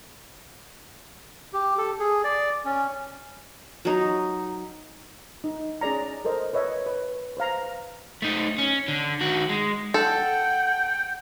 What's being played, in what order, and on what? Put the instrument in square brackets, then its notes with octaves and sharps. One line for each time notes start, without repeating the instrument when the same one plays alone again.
[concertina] G4
A4
G#4
D5
C#4
[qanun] F#3 D#4
[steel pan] D#4
C#4 G#4 D5 A#5
A4 A#4 C5 D#5
B4 C#5 D#5 E5
B4
B4 C5 F5 A#5
[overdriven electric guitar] A3 D#4
C#4
D3
D#3 F#4
G#3
[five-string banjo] A4 [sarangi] F#5 [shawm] G5